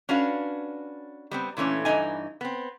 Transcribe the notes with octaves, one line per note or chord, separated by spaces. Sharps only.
C#4 D4 F#4 B4 F5
G3 B3 C4
A#2 E3 A3 C#4 D4
G2 A#2 E3 D#4 G#5
B3 C4